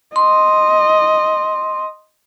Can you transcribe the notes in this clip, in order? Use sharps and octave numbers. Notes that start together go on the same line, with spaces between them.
D#5 C6